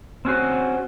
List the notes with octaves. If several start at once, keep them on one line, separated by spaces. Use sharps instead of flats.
C4 C#4 F#4 C5